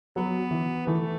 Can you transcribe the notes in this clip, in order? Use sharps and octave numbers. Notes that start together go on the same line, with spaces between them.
F#3 B3
E3
E3 A3